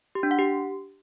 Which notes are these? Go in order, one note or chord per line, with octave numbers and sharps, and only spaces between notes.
G4
D4
F#5
G4